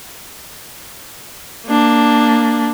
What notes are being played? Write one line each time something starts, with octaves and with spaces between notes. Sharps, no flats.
A#3 D4